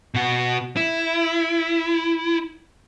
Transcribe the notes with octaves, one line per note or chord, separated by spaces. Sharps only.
B2 F#4
E4